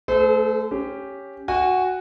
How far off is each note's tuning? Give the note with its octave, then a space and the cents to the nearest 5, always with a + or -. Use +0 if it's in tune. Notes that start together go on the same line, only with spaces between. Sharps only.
A3 +0 A4 -45 C5 -35
C#4 +0 G4 +0
F#4 +0 G#5 -30